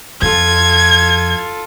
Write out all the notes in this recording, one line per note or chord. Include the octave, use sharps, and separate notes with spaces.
F2 F4 A4 G#6